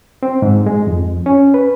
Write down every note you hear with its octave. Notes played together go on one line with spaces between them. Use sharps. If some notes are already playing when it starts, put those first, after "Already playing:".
C4
G#2
G#3
F2
C#4
B4